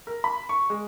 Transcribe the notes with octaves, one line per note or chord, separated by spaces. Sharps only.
A#4
B5
C#6
G#3